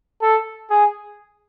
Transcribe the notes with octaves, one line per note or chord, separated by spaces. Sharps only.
A4
G#4